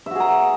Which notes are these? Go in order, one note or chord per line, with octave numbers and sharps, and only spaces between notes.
F#4 G#4 E5 A#5